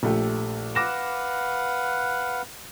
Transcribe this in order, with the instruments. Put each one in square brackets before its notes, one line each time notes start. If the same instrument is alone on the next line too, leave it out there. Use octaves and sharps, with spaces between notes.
[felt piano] A#1 A3 G4
[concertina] B4 F5 F#5 [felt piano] D6 A#6 E7